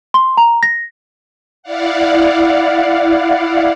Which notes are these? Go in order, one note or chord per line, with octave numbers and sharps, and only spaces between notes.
C6
A#5
A#6
E4 D5 F5 F#5